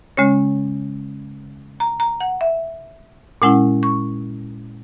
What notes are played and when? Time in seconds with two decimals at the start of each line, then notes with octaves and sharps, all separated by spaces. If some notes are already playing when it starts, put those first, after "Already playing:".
0.17 C#3 G#3 C#4 C#5
1.80 A#5
2.00 A#5
2.20 F#5
2.41 E5
3.42 A#2 G#3 C#4 E4 F#5
3.83 C#6